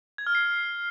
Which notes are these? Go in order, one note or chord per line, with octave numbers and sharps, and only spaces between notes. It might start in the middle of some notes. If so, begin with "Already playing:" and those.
G#6
F6
C7